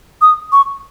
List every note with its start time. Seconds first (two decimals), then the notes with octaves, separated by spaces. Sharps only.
0.21 D#6
0.52 C#6